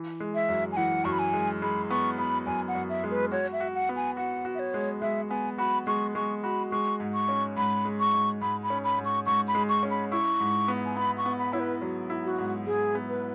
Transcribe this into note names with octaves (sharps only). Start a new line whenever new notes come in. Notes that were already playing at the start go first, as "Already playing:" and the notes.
Already playing: E3
G#3
E5
F#2
G#5
E3 F#5
F#2 C#6
B5
G#5
G#3
G#3 B5
B3 C#6
B3 B5
F#2 G#5
F#5
F#2
E5
G#3
B4
F#4 C#5
E5
F#4
F#5
B3
G#5
F#4 F#5
F#4
E5
C#5
G#3
G#3 E5
B3 G#5
F#4 B5
G#3 C#6
G#3 C#6
F#4 B5
G#3 C#6
G#2
C#6
C#4
G#2 B5
G#3
C#6
G#2
G#2 B5
B5
C#4
B5
G#2
C#6
G#2 C#6
B5
G#3
C#6
C#4
B5
E4 C#6
G#2
B3
G#5
B3 B5
C#6
B3
B5
E4 C#5
B4
F#3
E4
F#4
G#2
G#2 G#4
B3
B4